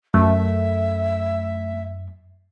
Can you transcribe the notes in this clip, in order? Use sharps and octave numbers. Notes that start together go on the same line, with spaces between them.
F#2 A3 E5